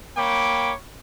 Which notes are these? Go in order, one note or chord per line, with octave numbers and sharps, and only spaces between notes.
A#3 C#5 G5 B5 D6